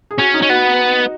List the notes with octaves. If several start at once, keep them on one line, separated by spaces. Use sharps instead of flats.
G#4
C#4 F#4
D#4
C#4
B3 F#4